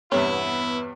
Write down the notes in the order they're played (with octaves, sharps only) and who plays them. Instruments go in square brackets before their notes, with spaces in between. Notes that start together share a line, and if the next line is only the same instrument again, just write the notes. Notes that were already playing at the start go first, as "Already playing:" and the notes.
[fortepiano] E2 G2 C3 [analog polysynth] B3 [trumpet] E4 [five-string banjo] C#5